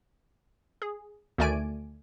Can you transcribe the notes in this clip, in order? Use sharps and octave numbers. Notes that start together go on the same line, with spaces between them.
G#4
D2 D#3 A3 D5 G#5 D7